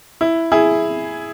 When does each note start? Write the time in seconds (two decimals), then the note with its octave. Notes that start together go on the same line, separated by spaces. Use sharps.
0.21 E4
0.52 E4 G#4